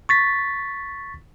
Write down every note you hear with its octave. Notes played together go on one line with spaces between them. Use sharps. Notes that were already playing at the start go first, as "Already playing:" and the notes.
C#6 A6 B6